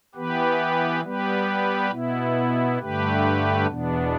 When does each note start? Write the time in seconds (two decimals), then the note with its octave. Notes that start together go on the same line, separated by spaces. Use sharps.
0.15 E3 B3 G4 B4
1.03 G3 B3 G4 B4
1.90 B2 B3 E4
2.79 G2 D3 A3 G4 B4
3.66 E2 B2 B3 D4